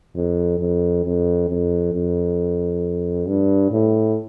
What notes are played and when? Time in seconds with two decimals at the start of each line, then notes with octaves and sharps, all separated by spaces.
0.15 F2
0.59 F2
1.05 F2
1.49 F2
1.93 F2
3.27 G2
3.71 A2